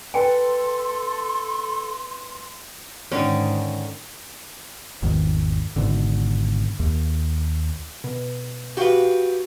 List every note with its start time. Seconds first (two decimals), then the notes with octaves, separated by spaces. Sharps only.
0.14 A4 B4 G5 G#5 C6
3.12 G#2 D3 D#3 C#4
5.03 G#1 E2 D#3
5.76 G#1 B2 D3
6.80 D#2
8.04 B2
8.77 F#4 G4 B4 F5